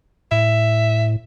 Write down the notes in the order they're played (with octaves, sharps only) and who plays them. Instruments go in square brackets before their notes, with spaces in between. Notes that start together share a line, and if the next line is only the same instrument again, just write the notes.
[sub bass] A2 [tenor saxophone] E5